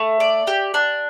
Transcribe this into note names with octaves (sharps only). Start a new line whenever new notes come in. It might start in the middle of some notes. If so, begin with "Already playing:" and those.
Already playing: A3
D5
G4
D4